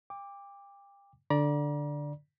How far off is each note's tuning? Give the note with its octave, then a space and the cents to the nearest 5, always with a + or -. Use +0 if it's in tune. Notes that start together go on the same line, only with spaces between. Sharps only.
G5 +35 D6 +0
D3 +0 D5 +0 A#5 +40